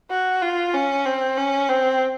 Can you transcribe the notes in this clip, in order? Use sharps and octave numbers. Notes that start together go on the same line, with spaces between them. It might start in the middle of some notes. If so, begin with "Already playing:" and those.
F#4
F4
C#4
C4
C#4
C4